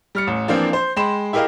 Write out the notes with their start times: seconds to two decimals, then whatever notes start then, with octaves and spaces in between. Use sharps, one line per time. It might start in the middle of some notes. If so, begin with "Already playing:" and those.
0.15 G3 F6 C#7
0.27 A1
0.48 E3 F3 A#3 C4 D4 F4
0.73 C5 C6
0.96 G#3 G5 B5 C6 E7
1.33 E4 G4 G#4 A#4 D#5 F5